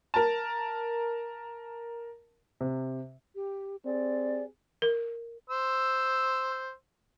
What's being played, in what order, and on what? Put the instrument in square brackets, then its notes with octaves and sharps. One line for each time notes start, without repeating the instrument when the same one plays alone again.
[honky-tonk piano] A#4 A5
[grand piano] C3
[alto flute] G4
[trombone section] C4 G4 G#4 [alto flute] D5
[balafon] A#4
[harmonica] C5 E6